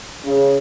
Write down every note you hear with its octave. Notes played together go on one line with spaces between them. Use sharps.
C#3